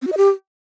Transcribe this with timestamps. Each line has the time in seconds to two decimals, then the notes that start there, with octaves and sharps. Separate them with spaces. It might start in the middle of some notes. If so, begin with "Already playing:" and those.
0.02 C4
0.07 F#4
0.12 D#5
0.17 G4